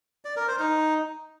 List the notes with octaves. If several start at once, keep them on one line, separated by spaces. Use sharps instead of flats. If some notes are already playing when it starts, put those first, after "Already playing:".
D5
A#4
C5
D#4